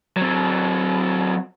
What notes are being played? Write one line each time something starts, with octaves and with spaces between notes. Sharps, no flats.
F#3 C4